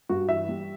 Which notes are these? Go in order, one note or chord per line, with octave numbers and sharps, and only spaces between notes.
G2 F#4
E3 E5
G3